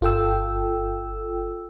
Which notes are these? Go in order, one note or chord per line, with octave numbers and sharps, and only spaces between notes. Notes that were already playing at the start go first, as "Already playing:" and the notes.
G1 F4 A4 G5 E6